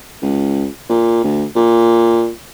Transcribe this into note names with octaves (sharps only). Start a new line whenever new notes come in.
C#2
A#2
D2
A#2